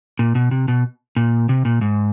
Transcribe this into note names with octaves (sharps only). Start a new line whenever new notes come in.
A#2
B2
C3
B2
A#2
C3
A#2
G#2